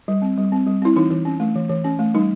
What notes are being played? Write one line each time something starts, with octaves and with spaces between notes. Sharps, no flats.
G3
C4
G3
C4
G3
C4 E4
E3 D#4
E3
C#4
A3
E3
E3
C#4
A3
G3 D#4